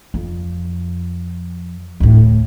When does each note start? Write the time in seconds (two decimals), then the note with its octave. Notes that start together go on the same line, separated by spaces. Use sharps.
0.14 F2
2.00 D2 A2